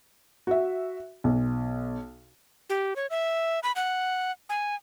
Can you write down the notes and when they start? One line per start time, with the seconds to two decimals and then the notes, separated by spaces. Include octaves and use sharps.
0.47 F#4 E5
1.24 B1
2.70 G4
2.96 C#5
3.10 E5
3.63 B5
3.76 F#5
4.49 G#5